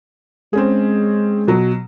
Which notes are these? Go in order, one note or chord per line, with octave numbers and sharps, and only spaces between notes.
G#3 C4 C#4 G#4
B2 F#3